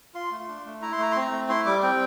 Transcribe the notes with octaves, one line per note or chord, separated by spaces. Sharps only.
F4 C6
A3
D4
A3
E4 A#5
C6
A3 A#5
C4 C6
A#5
A3
E4 C6
G3 D6
C4 G5